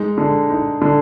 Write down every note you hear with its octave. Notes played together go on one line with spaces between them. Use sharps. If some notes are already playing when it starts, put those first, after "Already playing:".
Already playing: G#3 D#4
D3
D#4
D3